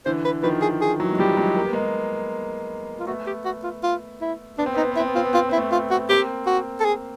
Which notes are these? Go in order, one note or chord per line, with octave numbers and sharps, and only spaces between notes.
D3 E3 C5
B4
D#3 F3 B4
G#4
G#4
E3 F#3
G#3
F3 G3 G4
F#3 G#3
A#3
B3
G#3 A#3
F4
A3 B3 F#4
G4
F#4
F4
F4
E4
B3 D4
C4
B3 D#4
C4
B3
E4
C4
B3
C4 F4
B3
C4 F4
B3
C4 E4
A3 B3
F4
F#4
A#3 C4 G4
F#4
A4
G#4